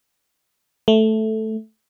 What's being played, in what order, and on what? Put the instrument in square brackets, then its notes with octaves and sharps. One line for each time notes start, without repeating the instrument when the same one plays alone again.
[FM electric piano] A3